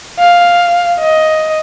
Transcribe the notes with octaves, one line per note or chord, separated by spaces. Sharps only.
F5
D#5